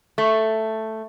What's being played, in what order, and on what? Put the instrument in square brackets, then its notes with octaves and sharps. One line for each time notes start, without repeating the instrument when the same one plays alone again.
[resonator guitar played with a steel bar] A3